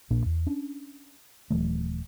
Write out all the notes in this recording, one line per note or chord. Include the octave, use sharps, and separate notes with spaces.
A#1 A#2 A#3 D4
E2
C#4 D4
D#1 E3 F#3 A3